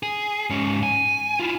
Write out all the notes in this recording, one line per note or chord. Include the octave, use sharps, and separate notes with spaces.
G#4
G#2 C#4
G#5
E4 F4